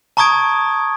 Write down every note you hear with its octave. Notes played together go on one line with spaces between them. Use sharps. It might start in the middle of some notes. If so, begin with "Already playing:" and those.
A5 A#5 C#6 D#6 G#6 D7